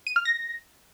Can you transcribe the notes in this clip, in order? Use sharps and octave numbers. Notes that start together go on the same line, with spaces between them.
D#7
F6
A#6